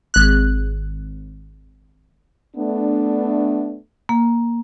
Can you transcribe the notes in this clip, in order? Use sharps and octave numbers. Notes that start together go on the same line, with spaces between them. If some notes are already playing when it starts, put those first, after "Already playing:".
G#1 F#6
A3 B3 D4
A#3